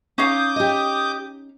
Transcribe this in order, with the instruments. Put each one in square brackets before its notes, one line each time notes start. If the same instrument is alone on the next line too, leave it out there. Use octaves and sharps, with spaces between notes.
[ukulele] C#4 D#4 F5 [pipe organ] D6 D#6 G6
[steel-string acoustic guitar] G4 D#5